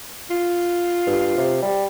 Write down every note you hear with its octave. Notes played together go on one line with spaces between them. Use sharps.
F4
G2
C3
G3